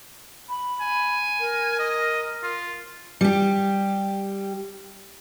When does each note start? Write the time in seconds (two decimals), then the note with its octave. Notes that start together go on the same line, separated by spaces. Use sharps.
0.49 B5
0.81 G#5
1.40 A#4
1.80 D#5
2.43 F4
3.21 G3 G4